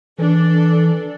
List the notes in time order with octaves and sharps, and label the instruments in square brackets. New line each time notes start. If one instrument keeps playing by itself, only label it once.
[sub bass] E3 [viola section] D4 A4